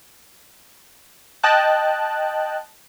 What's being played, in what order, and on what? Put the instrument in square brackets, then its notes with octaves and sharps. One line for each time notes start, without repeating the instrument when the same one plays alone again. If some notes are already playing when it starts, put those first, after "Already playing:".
[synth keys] D#5 G5 A5 F#6